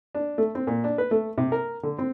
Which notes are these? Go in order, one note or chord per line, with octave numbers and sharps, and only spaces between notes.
D4
A3
C4
A#2
D4
B4
A3
C3
A#4
D3
C4